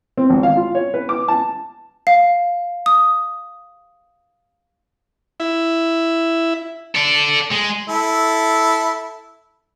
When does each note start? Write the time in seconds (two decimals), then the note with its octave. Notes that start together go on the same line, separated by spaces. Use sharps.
0.18 C4
0.30 G#1
0.43 F5
0.56 F4
0.75 C#5
0.94 B4
1.09 D6
1.28 A5
2.07 F5
2.86 D#6
5.40 E4 E5
6.95 A4 D5
7.52 G#3
7.88 E4 A4